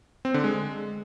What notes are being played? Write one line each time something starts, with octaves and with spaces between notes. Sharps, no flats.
C4
D3
G#3